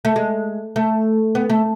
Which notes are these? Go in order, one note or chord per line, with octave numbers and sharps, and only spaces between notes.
A3
G#3
A3
B3
A3